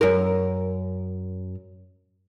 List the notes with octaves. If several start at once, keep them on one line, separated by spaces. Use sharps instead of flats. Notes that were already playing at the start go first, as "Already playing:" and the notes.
F#2 A#4